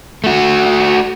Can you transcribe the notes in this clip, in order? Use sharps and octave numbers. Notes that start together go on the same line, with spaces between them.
A3 F#4